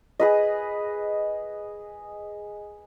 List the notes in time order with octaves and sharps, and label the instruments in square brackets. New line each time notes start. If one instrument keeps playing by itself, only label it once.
[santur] G#4 B4 D#5